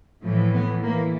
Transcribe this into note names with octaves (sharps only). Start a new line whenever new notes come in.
A2 E3 F3
B3
A2 E3 A#3